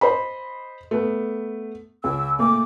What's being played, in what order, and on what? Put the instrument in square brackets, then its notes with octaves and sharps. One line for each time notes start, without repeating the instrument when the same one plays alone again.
[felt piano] C5 D#5 B5
A3 B3
[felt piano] C#2 [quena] E6
[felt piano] A#2 A3 [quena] D6